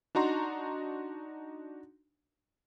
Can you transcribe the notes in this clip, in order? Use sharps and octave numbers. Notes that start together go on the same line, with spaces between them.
D4 D#4 F#4 A#5 C6